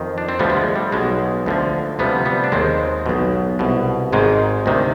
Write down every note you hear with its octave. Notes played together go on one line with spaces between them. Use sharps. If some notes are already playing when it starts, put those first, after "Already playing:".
Already playing: F2 D#3
D4
C4
D2 D3 F3 G3 B3
G3
G#3
G3
B1 B2 G#3
D2 D3 F3
D2 C3 F3 G3 B3
G3 B3
D4
D#2 D#3 G#3 C4
B1 B2
C2 B2
G#1 G#2 D#3 G#3
D2 C3 D#3